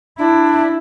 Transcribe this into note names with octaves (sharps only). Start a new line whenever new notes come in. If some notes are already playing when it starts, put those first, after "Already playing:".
D4 E4